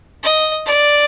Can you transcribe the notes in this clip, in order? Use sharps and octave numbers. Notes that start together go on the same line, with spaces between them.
D#5
D5